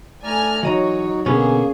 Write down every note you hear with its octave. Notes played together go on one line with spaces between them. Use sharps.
A3 D5 G#5 A#5 F6
E3 F#3 D#4 F#4 C#5 D#5 A#5
B2 D3 A#3 B3 C#4 G#4